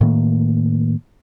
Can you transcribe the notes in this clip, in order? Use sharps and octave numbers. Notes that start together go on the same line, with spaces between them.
A2 D#3 A#3